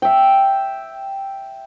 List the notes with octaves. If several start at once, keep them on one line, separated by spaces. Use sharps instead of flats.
E5 G5